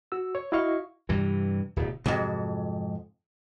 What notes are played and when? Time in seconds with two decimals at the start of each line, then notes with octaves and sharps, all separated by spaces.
0.12 F#4 E6
0.35 C#5
0.52 E4 F#4 D#5 F5 C#6
1.09 G2 C3 E3
1.76 D1 B2
2.06 F2 G#2 C3 F#3